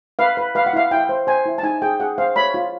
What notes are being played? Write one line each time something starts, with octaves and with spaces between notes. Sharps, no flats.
B4 F5
B4
B4 F5
F#5
E4 F5
E4 G5
C5
C5 G#5
E4
A5
D#4 G#5
G#4 G5
G#4 F#5
C5 F5
C#5 B5
F4